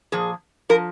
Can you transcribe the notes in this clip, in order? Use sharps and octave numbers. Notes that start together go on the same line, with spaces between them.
A#2 F3 G#4
F3 A#4